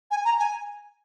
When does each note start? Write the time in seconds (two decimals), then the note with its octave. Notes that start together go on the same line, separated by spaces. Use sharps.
0.11 G#5
0.25 A#5
0.39 G#5